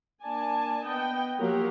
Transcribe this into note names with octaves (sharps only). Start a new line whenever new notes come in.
A#3 D4 D5 G#5 A5
B3 D#5 G5
F3 F#3 A#3 G4 A#4